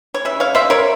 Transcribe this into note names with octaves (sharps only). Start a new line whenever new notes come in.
C#5
C#3 E3 E5
C#5 F5
C5 E5
A#4 C#5